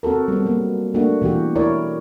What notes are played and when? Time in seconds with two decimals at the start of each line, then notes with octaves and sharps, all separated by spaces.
0.03 C4 F#4 A4 A#4
0.28 G3 B3
0.46 F#3 A#3
0.94 A3 A#3 D4 F#4
1.22 B2 E3 F#4 G4
1.55 E4 A#4 C#5 D5